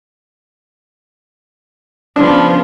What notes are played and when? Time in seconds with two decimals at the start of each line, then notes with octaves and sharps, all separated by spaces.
2.16 C#3 F3 B3 D4